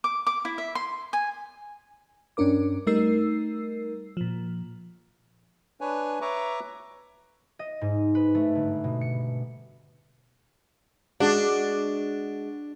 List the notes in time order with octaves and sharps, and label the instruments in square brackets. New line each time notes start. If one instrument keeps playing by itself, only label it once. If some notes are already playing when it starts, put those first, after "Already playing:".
[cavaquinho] D6
D6
E4
E5
C6
G#5
[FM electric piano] G2 C#4 D4 A#4 D6
G3 A3 D#4 A#4 E6 C7
A#2 F3
[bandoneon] D4 B4 C#5 G#5
B4 C#5 E5 A#5 C#6 D6
[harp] D#5
G#2
B4
A3
G1
B2
C#7
[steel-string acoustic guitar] G#3 F#4 [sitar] D4